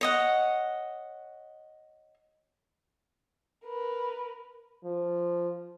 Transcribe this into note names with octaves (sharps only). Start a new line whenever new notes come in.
C#5 D#5 F#5
A#4 B4
F3